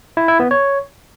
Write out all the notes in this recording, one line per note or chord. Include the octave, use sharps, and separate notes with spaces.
E4
E4
B3
C#5